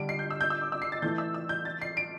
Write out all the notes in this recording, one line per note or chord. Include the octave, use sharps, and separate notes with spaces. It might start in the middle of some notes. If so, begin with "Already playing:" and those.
Already playing: D3 G3 D4 D7
C7
G6
E6
G6
E6
D6
E6
C7
A6
E3 A3 E4 G6
E6
E6
G6
A6
C7
D7